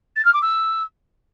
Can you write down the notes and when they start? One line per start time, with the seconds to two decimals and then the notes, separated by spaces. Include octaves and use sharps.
0.16 A6
0.25 F6
0.34 D6
0.42 E6